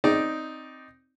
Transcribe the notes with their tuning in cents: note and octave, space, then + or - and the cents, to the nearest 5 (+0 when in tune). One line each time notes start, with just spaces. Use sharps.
C4 +0 D#4 +0 D5 +0